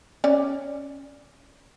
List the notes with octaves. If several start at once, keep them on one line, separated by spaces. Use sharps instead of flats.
C#4 C#5 D5